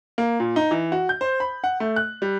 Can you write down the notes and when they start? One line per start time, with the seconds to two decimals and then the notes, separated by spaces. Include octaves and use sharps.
0.18 A#3
0.40 A#2
0.56 D#4
0.71 E3
0.92 F#4
1.09 G6
1.21 C5
1.40 B5
1.64 F#5
1.80 A3
1.96 F#6
2.22 G3